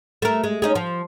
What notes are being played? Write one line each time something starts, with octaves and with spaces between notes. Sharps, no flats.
A3 A#4
G#3
C#4 D#4 G#4
F3